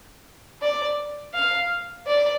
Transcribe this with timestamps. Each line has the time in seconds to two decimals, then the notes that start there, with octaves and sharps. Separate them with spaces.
0.62 D5
1.34 F5
2.07 D5